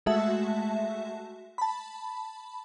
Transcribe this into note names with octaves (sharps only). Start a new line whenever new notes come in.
G#3 A3 F#4 E5 A5
A5 B5